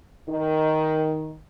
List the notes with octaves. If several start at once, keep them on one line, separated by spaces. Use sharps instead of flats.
D#3